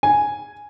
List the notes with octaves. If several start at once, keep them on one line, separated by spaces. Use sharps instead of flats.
G#5